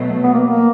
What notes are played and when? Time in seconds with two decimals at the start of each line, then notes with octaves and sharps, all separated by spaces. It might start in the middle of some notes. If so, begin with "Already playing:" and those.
Already playing: B2 F#3 A3
0.23 B3
0.33 A#3
0.45 A#3